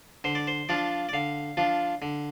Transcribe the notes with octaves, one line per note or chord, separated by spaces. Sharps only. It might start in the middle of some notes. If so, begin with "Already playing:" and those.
D3 C5
D5
C5
F3 D4 F4 D5
D5
D3 F5
F3 D4 F4
D3